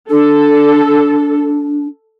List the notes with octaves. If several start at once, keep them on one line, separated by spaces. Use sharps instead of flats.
D4 A4